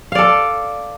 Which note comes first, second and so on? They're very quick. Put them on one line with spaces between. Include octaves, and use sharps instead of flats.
F5 D5 A4